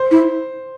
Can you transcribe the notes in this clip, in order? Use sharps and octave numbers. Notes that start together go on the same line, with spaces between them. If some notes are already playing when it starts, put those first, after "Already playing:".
Already playing: C5
E4